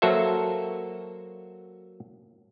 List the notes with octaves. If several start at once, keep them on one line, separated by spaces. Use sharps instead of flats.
F#3 A#3 F#4 A4 C5 E5